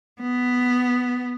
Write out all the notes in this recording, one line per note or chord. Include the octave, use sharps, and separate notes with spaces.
B3